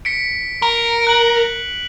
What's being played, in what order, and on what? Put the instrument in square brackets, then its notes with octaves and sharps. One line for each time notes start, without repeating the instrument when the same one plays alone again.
[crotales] B6 C#7 D7
[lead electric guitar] A#4
[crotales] F#6 F#7